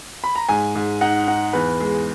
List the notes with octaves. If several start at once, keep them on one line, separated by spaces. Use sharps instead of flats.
B5
A#5
G#2 G#5
G#2
D#4 F#5
D#4 F#5
E2 B4
G#3